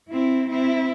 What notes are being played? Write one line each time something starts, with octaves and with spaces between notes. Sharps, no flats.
C4 E4
C4 E4